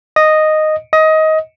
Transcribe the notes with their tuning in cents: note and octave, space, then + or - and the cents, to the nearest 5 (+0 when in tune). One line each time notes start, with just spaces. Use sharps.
D#5 -5
D#5 +20